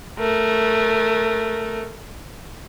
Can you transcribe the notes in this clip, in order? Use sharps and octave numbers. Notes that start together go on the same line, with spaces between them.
A3 A#4